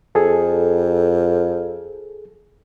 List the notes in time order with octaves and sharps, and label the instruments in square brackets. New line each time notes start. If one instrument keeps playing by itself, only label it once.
[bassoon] F2 [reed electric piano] G#4 A4